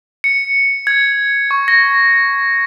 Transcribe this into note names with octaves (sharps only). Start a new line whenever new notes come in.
C#7
G#6
C#6
A#6